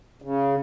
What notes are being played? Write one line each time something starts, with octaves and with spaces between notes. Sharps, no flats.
C#3